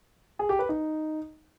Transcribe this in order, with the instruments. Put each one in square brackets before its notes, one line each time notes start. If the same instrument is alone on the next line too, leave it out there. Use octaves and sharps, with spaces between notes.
[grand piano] G#4
G4
B4
D#4